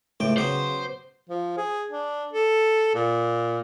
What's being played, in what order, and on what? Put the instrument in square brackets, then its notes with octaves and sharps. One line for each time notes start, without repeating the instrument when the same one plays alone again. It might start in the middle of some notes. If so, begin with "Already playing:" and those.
[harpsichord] C#2 A2 G5 [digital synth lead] A3
[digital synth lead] C#3 [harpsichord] F#3 B3 G4 [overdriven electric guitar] C5
[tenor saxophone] F3
G#4
D4
A4
A#2